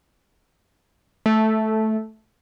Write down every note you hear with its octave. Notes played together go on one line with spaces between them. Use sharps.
A3